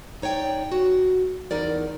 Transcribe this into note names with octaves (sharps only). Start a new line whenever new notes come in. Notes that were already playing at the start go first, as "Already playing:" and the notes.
D#4 C#5 D5 G5
F#4
E2 D#4 A#4 D5